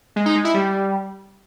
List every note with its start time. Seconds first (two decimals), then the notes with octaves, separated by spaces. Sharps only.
0.16 G#3
0.26 D#4
0.35 G#3
0.45 E4
0.54 G3